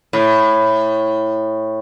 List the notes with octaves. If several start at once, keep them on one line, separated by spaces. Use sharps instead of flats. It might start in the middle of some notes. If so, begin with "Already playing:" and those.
A2